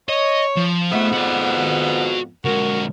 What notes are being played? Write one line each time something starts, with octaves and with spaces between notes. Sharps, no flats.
C#5 D#5
F3
F2 G#2 A3 B3 E5
F#4 D5
D3 G#3 F#4 A#4